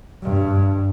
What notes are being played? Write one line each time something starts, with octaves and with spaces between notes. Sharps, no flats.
G2